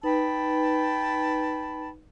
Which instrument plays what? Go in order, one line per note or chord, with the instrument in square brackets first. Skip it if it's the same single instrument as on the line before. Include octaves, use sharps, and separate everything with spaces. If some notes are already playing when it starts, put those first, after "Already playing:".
[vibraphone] D#4 B4 [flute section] G5 A5 B5